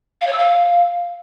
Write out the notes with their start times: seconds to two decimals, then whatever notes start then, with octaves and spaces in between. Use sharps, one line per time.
0.21 F5
0.27 C#5
0.33 E6
0.38 F5